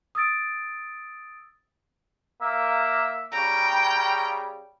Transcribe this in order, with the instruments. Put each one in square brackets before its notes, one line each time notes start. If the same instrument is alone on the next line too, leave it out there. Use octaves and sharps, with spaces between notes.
[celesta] D#6 E6 A6 D7
[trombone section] A#3 [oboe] E5
[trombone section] C#3 G3 [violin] G5 [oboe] A#5